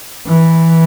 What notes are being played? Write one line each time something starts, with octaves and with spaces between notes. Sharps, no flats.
E3